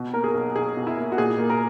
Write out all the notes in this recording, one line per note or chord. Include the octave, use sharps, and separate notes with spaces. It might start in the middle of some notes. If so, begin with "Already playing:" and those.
Already playing: B2
A#3 A#4
G#4
B1
B1 G#4
B2
E4
A#3
F#4
A#2 G#4
A#3
A#4